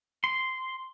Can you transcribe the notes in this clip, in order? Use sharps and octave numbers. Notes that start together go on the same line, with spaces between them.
C6